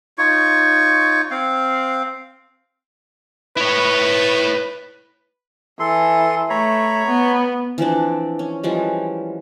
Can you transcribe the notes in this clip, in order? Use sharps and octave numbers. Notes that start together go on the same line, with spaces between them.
D#4 F4 C#5 C#6
C4 F5
E4 B4 C#5
E3 A4 C6
A3 C#5 A#5 B5
B3
E3 F3 C4 D4
C#4
E3 F3 G3 G#3